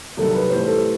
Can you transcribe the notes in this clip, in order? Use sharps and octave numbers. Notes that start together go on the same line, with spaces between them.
C2 C3 D#3 F#3 A4
B4
A2 E3 G3 C5
A4